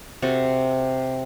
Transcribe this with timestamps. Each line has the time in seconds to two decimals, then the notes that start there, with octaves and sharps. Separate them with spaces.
0.22 C3 F#4 A4